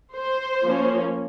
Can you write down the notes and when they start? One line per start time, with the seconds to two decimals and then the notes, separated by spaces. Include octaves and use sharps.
0.14 C5
0.64 F3 A#3 C#4